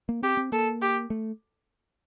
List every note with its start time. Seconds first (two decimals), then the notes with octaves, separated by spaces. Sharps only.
0.09 A#3
0.23 C4 G4
0.37 C4
0.52 A#3 A4
0.82 G4
1.10 A3